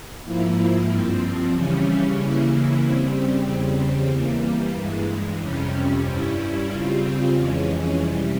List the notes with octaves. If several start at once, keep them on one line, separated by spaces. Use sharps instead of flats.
G#2 F3 A#3 E4
G2 F3 C4
C#3 E3 G3 C#4
C#3 E3 A#3 E4
C#3 G3 C4
E2 C#3 G3 C4
E3 G3 A#3
G2 E3 G#3
F2 C3 G3 C#4
G2 G3 C#4 E4
C#3 G3 C4 F4
F2 E3 G#3 C#4
C3 E3 G3